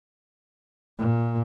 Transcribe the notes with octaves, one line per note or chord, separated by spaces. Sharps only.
A#2